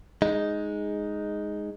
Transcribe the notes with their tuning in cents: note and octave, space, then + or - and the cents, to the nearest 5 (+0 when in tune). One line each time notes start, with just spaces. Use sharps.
G#3 +0 D#4 +0